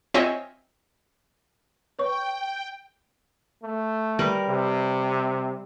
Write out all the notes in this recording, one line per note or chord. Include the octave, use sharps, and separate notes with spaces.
C4 F4 C#5 D#5 E5 G#5
B4 C#5 G5 C#6
A3
G3 A#4 B4
C3